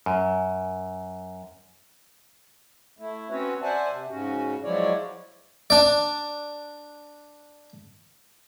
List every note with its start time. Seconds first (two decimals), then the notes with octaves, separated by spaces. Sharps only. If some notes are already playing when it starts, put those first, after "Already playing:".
0.06 F#2
2.99 A3 E4
3.30 C4 C#4 F#4 B4 C#5
3.62 C5 D5 E5 F#5 G#5 A5
3.90 C3
4.09 G#2 C#3 C#4 F#4
4.63 F3 F#3 G#3 E4 C#5 D5
5.70 D4 D5